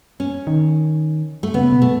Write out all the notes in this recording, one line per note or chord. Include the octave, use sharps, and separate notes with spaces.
C#4
D#3
A3
C#3 B3
B2
A3